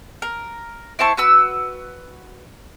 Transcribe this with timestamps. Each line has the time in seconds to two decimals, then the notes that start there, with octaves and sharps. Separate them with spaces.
0.22 A#4
0.99 E4 C5 A5 C#6
1.17 F#4 B4 E6